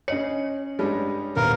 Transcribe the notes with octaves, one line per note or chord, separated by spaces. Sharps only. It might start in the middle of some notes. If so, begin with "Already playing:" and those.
C#4 C#5 D#5 C#7
G2 G3 G#3
D#1 B3 A#4 F5